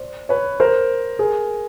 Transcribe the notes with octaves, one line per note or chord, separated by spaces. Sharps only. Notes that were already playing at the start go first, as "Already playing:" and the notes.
Already playing: C5 D5
B4 C#5
A#4 C5
G#4 A#4